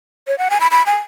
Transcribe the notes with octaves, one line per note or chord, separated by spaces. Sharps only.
C#5
F#5
G#5
B5
B5
G#5